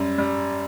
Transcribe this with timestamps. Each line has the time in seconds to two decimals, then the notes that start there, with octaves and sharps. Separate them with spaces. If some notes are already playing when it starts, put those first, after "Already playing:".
Already playing: F#2 G3
0.18 G3